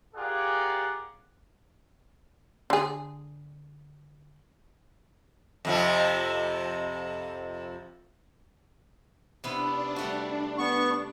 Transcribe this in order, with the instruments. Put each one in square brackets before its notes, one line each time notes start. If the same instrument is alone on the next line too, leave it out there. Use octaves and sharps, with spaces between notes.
[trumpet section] F4 G4 G#4 A#4 D5 F#5
[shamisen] D3 G#4
[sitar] F2 C3 F3
[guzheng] C3 B3 E4 [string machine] D4
[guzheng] G3 A3 F#4
[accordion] B3 C#6